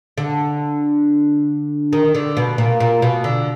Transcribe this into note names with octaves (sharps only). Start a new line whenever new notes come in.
D3
D#3
D3
B2
A#2
A#2
B2
D3